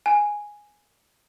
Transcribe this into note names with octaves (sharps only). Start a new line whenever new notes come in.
G#5